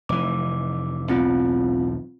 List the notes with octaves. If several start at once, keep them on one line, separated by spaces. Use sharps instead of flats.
F1 E3 D6
B1 E2 A2 C4 F4